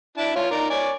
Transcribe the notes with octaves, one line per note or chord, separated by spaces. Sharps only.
D4 E4 A5
F4 C#5
D#4 A#4 D5
C#5 D5 G#5